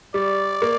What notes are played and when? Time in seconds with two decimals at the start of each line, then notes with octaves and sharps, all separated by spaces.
0.14 G3 D5
0.62 A#3